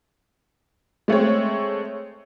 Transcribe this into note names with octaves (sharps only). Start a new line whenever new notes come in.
G#3 A3 C4 C#5